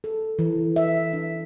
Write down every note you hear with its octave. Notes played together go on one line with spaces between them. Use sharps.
A4
E3
E5
D4